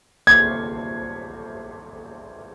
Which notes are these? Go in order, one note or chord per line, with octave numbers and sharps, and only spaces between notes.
G#6